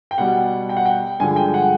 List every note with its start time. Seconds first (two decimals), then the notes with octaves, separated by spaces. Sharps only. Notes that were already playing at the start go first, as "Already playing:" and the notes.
0.11 G5
0.18 B2 G3 F#5
0.69 G5
0.77 F#5
0.86 G5
1.20 G2 D3 F3 G#3 G#5
1.36 G5
1.54 F#5